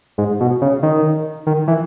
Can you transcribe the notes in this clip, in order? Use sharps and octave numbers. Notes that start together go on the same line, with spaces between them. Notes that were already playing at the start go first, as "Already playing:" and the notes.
G#2
B2
C#3
D#3
D#3
E3